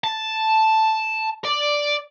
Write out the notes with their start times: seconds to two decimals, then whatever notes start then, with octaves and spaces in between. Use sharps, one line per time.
0.04 A5
1.44 D5